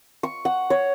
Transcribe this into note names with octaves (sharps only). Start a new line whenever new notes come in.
C#6
F#5
C#5